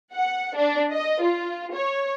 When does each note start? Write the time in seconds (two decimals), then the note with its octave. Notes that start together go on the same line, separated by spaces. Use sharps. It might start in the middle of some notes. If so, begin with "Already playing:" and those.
0.14 F#5
0.56 D4
0.92 D#5
1.22 F4
1.74 C#5